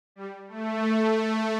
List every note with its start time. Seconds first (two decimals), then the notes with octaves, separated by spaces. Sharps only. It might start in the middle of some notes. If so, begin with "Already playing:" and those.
0.16 G3
0.48 A3